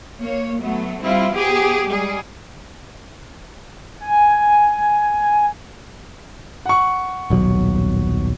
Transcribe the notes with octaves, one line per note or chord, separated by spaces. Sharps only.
A#3 C#5
F#3 A3 B3
G3 C4 E4 F4
F3 B3 G4 G#4
G3 G#3 G#4
G#5
F#5 C#6
D#1 B1 F#3